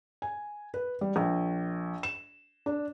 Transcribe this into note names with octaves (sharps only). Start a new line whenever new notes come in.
G#5
B4
G3
A#1
E7
D4